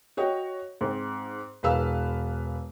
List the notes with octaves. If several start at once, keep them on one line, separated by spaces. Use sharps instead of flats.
F#4 C#5 D#5 G5
G#2 C4
E1 B4 F5 E6